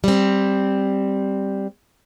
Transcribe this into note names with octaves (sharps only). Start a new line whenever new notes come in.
G3 C4